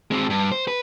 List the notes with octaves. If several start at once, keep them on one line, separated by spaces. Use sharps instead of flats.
G#3 C4
G2
C5
B4